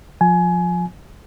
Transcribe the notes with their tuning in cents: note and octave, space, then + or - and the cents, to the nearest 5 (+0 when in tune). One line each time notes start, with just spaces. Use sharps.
F3 +25 G#5 +20